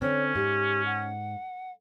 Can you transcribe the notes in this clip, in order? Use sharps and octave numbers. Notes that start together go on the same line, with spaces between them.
D3 C4 C#4 C#5
G#2 G4
F#5